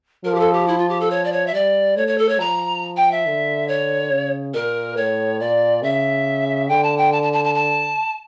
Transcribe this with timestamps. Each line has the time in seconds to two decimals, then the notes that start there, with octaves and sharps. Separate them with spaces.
0.25 F3 A#4
0.35 G4
0.39 A4
0.53 G4
0.68 E4
0.78 F4
0.89 G4
1.00 A4
1.11 C#5
1.24 D5
1.32 C#5
1.47 E5
1.53 G3 D5
1.96 A3 C#5
2.07 C#5
2.18 A4
2.29 C#5
2.40 F3 A#5
2.97 G5
3.11 E5
3.26 D3
3.68 C#5
4.11 C#3
4.54 A#2 A#4
4.97 A2 C#5
5.40 A#2 D5
5.82 C#3 E5
6.69 D3 G5
6.83 A5
6.97 G5
7.12 A5
7.22 A5
7.33 A5
7.44 A5
7.55 A5